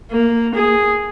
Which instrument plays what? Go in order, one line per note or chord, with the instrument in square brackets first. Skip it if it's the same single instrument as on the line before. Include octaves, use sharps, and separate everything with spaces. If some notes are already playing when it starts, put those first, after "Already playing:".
[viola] A#3
G#4